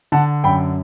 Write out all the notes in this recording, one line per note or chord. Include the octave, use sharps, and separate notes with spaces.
D3 F#5 A5
F#2 G5 B5